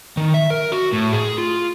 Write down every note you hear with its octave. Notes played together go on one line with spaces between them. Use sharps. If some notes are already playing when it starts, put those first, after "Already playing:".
D#3
E5
A#4
F#4
A2
G#4
F4